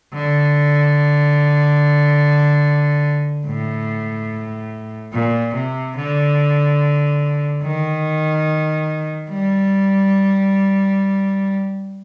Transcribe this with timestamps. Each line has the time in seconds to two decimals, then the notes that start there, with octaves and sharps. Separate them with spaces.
0.13 D3
3.46 A2
5.13 A#2
5.54 C3
5.96 D3
7.62 D#3
9.28 G3